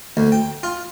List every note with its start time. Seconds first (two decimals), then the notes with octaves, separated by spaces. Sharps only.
0.17 D2
0.32 G5
0.63 F4